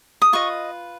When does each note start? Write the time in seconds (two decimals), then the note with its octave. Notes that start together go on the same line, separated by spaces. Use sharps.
0.22 D#6
0.33 F4 B4 D#5 C#6